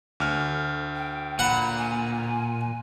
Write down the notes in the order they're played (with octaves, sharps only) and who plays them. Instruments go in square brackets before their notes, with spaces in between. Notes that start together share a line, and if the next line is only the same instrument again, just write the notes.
[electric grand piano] D2 F6
[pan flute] G5
[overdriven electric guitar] A#2 [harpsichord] F#5 [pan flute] B5
[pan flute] G#5